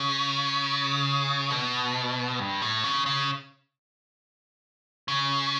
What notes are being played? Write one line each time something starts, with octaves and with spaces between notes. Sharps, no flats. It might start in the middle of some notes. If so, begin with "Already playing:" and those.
Already playing: C#3
B2
G2
A2
C#3
C#3
C#3